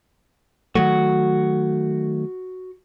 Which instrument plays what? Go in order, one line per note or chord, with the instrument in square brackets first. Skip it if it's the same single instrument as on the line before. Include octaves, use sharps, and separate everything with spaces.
[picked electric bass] D#3 F#3 A3 [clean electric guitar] F#4